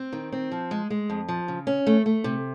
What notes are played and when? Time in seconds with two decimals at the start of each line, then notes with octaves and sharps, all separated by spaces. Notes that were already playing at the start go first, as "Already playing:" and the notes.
Already playing: C4
0.13 D#3
0.32 C4
0.51 F3
0.71 G#3
0.90 G#3
1.10 F2
1.28 F3
1.48 C#3
1.67 C#4
1.86 A3
2.06 A3
2.24 C3